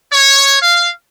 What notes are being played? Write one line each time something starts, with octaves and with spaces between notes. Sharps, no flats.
C#5
F5